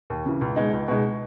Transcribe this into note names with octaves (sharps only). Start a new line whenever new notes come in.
D#2
C#3 E3
C#2
B2 G#3 D#4
C#2
B2 G#3 D#4